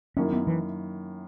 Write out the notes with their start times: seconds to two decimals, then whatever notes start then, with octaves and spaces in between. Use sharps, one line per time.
0.17 F#2 D#3 A#3 C#4 E4
0.33 B3
0.47 E3